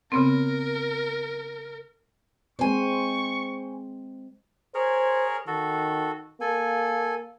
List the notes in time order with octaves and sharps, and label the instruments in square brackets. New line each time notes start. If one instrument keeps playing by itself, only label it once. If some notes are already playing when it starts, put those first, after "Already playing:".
[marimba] C#3 B3 C4 [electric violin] A#4
[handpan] G#3 C4 [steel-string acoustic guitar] C5 G#5 [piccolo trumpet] C#6
[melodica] G#4 A#4 C#5 [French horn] C5
[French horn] D#3 [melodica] F#4 A4
[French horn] A#3 [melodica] A4 G#5